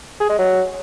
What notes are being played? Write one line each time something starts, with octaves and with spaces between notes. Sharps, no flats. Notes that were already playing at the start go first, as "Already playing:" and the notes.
G#4
G#3
F#3